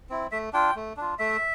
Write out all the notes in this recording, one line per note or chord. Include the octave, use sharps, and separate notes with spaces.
C4 E4
A3 E5
D4 F4 G5
A3
D4 F4
A3 E5